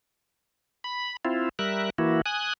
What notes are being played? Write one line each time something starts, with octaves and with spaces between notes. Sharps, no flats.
B5
C4 E4 F4
G3 A#4 E5 F#6
E3 A#3 E4 F#4
G#5 D#6 F#6